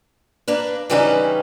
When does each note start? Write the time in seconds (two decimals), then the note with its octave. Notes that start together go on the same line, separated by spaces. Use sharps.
0.48 A#3 D4 B4
0.90 C#3 E3 G3 C#4 D#4 B4